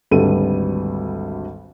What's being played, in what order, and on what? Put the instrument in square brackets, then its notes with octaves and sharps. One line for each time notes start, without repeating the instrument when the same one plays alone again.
[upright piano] G#1 D2 G3 A4 B4 D#7